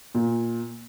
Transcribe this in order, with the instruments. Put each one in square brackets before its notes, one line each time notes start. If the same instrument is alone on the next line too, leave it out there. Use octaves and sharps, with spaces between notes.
[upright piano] A#2